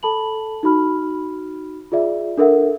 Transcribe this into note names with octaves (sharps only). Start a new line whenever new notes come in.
A4 A5 B5 F#7
D#4 F#4 B5 F6
F4 G#4 D5 E5
D4 A4 A#4 E5 F#5